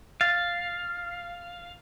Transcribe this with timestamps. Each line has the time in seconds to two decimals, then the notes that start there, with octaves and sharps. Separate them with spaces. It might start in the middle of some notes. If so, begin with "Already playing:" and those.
0.21 F5 A6